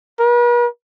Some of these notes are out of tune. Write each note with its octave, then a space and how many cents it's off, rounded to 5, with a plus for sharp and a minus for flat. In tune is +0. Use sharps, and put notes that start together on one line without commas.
B4 -45